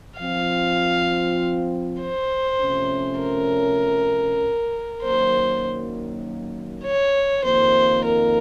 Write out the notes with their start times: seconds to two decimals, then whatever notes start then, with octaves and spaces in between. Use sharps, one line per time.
0.19 F3 C4 F4 F5
2.01 C5
2.61 C3 F3 A3 C#4
3.21 A#4
5.02 F#2 D#3 F#3 A#3 C5
6.84 C#5
7.44 F2 D#3 A#3 C5
8.04 A#4